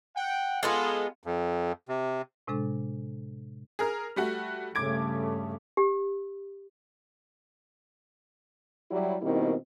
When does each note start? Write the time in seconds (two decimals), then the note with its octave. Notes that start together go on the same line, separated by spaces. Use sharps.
0.15 F#5 G5
0.63 G#3 B3 F4 G#4 A4
1.23 F2
1.89 C3
2.47 A2 C3 G#3 D4 A4
3.79 G#4 A#4 F6
4.16 G3 A3 F#4
4.75 G2 C#3 A3 D6 G#6 D7
5.77 G4
8.91 F#3 G3 E4
9.22 B2 D#3 G3 A#3 C4 E4